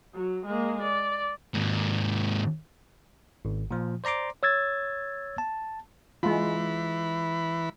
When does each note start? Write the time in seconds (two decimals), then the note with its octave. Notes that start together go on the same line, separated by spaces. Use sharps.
0.15 F#3
0.46 G#3 A#3
0.82 D5
1.55 D#2 G#2
3.45 G#1
3.71 A#2 F3
4.04 C5 D5 A#5 C6 D6
4.43 C#5 E6 G#6 A6
5.38 A5
6.23 E3 G#3 F4 B5